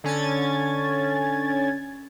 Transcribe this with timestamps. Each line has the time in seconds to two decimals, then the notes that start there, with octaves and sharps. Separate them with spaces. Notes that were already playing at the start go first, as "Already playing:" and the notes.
0.04 D3 C#4 G#6 A6